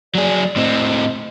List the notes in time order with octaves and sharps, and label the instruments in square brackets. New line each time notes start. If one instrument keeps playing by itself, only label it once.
[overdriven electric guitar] F#3 G#4 [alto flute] D5
[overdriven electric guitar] A2 C4 [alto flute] D#5